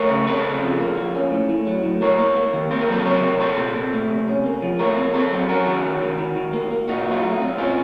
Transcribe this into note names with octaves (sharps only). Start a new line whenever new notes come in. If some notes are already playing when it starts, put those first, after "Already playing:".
Already playing: A3 A#4 C#5
C#3
C4 A4 C5
C#3
F3
A#3
F3
C#4
A2
A2
F#3
A2
A#3 A#4 C#5
A#3
A#3
D#3
C4 C5
A#4
F#3 A4 C5
C3 A#4 C#5
C3
C4 A4 C5
A#2
A#2
A3
C3
C#4
A#3
F3
A3 A#4 C#5
C4
C4 A4 C5
F#3
C#4 F#4 A#4
D#3
D#3
D#3
D#3
D#3
A#3
A#3
A#2 D#4 F#4
F#3
F4
A3 D#4
C4
A#2 C#4 F4